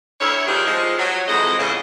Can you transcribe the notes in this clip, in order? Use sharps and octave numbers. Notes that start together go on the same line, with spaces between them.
D2 E4 C#5
D#3 F3 G3 C4 D4 G#4
F3 G#3
F#3
F2 E3 G#3 F#4 D#5
E2 G#2 C#3